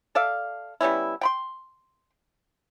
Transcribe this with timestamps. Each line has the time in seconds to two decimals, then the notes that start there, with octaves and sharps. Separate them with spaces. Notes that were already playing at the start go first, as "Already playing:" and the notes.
0.15 A4 D5 E5 F5
0.81 G3 B3 C#4 E4
1.21 G5 B5 C6